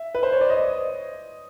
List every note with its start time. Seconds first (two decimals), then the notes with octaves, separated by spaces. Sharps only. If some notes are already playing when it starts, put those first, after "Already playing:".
Already playing: E5
0.15 B4
0.23 C5
0.32 C#5
0.41 D5
0.50 D#5